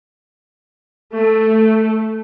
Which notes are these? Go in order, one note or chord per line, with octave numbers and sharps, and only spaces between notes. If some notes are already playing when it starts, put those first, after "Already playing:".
A3